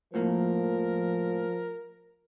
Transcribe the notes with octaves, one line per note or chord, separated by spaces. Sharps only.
F2 A2 F3 A#3 A#4